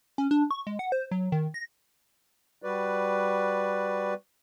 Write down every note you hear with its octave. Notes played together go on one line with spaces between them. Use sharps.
C#4
D4
C#6
G#3
F#5
C5
F#3
D#3
A#6
G3 F#4 B4 D5